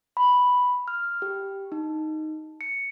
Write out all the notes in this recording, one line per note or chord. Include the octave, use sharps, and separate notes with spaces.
B5
F6
G4
D#4
C#7